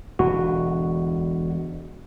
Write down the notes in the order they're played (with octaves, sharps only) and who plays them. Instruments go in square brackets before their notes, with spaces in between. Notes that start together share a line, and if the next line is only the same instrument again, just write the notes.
[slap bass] E1 D3 [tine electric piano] F#4